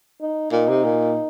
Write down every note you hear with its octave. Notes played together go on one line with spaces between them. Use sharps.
D#4
A#2 D#4
C3
A#2